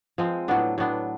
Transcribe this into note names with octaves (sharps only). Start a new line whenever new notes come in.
F3 G#3 C4
A2 F#3 B3 D4
A2 F#3 B3 D4